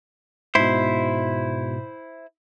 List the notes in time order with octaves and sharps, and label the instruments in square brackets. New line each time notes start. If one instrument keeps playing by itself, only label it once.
[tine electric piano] G#2 B2 [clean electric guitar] E4 C5